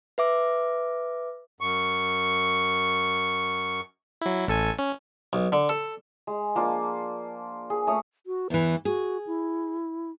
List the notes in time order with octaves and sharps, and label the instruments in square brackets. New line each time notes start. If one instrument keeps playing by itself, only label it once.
[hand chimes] B4 E5 D6
[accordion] F#2 C#6
[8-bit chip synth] F#3 E4
A1 A4 G#5
C#4
[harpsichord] B1
D3
A4
[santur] G#3
F3 A#3 D4 F4
G#4
A3 C#4 C#5 D#6
[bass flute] F#4
[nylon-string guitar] E2 E3 [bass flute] B4
[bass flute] F#4 [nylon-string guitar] G#4
[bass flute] E4